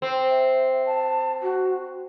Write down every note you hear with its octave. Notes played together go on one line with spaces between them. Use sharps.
C4
E5
A5
F#4